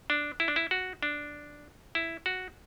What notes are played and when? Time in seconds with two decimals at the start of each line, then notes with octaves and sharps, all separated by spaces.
0.10 D4
0.40 E4
0.48 D4
0.56 E4
0.71 F#4
1.03 D4
1.95 E4
2.26 F#4